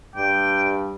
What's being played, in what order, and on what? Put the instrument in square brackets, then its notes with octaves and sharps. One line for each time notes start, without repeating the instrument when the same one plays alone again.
[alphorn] G2 [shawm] G5